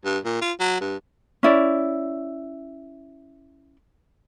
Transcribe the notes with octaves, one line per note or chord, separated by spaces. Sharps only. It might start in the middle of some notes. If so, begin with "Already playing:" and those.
G2
A#2
F4
F#3
G2
C#4 E4 D5